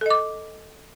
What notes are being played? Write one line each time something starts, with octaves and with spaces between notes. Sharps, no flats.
A4 D#5 D6